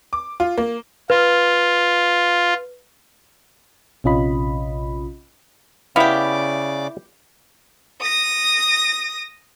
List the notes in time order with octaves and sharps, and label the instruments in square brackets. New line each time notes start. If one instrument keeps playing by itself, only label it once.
[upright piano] D6
F4
A#3
[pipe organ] F4 [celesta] B4
[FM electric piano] A#1 C3 C#4 F4 D#5 B5
[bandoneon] C#3 D5 D6 [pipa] B3 G4 [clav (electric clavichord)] E4 F5
[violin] D#6 A#6